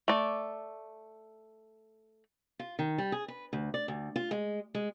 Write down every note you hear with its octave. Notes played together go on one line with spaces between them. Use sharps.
A3 D5
F4
D#3
G3
G#4
B4
D2
D5
D2
F4
G#3
G#3